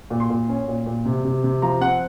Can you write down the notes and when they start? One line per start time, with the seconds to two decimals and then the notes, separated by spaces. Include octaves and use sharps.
0.10 A#2
0.20 C6
0.30 A#2
0.49 C#4
0.68 A#2
0.86 A#2
1.05 C3
1.24 C3
1.44 C3
1.62 F3 A#5
1.81 C4 F#5